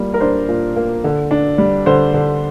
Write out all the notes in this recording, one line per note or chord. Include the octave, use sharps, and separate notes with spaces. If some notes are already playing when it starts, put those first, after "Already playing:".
Already playing: A#2 G3 A#3
A#4
D4 C5
A#2
A#3
D3
D4
G3
D3 C5
D3